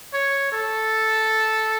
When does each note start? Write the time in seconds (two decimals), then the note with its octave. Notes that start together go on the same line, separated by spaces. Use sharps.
0.13 C#5
0.52 A4